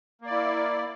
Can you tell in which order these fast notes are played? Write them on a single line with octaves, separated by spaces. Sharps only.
A#3 D5 E4